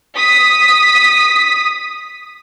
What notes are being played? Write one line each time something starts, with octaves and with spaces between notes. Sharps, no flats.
D#6 B6